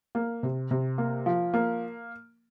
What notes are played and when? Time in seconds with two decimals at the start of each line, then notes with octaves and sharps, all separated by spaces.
0.15 A#3
0.43 C3
0.71 C3
0.98 A#3
1.26 F3
1.54 A#3